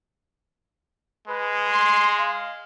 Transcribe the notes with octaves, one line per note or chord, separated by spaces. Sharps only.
G#3 B4
C6
F5